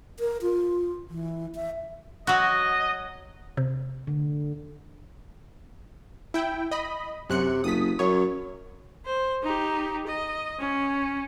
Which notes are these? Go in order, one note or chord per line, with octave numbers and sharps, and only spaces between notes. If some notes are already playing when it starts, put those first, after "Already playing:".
A#4
F4
E3
E5
F#3 F#4 D#5
C3
D3
E4 G5
D#5 B5
F#2 C3 F#6 C#7
F#1 D#6 B6
F#2 C#5
C5
D#4 G4
D#5
C#4